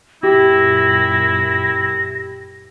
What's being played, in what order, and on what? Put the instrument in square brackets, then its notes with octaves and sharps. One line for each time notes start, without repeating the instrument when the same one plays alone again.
[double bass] F#2 A#2 [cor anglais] E4 [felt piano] G4 [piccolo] A#6